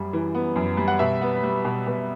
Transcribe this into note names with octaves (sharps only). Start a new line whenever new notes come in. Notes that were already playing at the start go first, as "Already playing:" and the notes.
Already playing: F#2 G3
E3
B3
F#2
G3
F#5
B2 E5
B3
G3
B2
B2